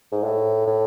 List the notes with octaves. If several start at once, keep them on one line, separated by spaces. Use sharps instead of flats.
G#2
A2
A2